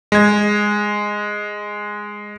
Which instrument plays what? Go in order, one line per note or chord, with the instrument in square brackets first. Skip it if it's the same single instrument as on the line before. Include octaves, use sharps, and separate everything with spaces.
[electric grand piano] G#3 G#6